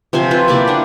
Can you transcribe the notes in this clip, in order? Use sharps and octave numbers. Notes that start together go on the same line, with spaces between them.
C3 F3 C5 G#5
F4 A4 B4
A#3 E4 G4 D5
D4 F#5